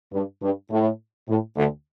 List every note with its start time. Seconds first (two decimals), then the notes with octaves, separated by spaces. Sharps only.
0.12 G2
0.42 G2
0.70 A2
1.28 A2
1.56 D2 D3